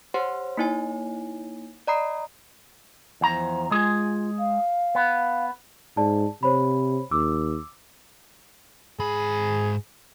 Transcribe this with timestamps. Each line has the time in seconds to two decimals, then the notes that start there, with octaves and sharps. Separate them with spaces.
0.14 G4 C5 C#5 F#5 C6
0.57 A#3 D#4 E4 C#5 G#5
1.87 D5 D#5 A#5 B5 D#6 C7
3.21 E2 F3 A#5
3.71 G#3 F4 G#4
4.38 F5
4.95 B3
5.97 G#2 G#4 D5 A5
6.43 C3 C5 C#5 B5
7.11 D#2 D6 E6
8.99 G#2 G#4 B5